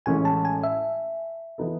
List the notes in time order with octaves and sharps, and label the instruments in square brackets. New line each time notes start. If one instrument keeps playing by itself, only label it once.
[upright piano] A1 A2 G#3 C#4 [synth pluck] G#5
[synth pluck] A5
G#5
E5
[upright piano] E3 B3 D#4 A4